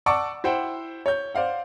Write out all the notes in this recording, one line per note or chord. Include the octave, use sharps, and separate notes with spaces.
D5 F#5 A5 C#6 D6 E6
E4 C5 F#5 G5
C#5 G6
C5 D5 F5 F#5